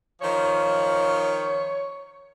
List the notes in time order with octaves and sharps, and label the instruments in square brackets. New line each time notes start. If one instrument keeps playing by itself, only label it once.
[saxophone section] D#3 F3 [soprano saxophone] C#5